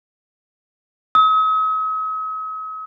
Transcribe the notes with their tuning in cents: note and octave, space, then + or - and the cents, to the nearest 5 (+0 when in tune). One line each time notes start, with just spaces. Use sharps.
D#6 +45